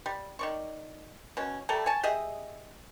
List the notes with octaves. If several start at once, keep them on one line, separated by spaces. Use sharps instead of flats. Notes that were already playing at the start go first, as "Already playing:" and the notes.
G3
D#3 D5 C#6
B2 C#4
G3 A3 A4 A#5
C#5 G#5 A5
G4 G#4 D#5 E5